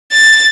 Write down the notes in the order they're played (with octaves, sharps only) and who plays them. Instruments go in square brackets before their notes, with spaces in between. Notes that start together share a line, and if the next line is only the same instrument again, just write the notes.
[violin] A6